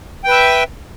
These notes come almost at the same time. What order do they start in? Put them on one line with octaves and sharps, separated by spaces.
G5 B4 E5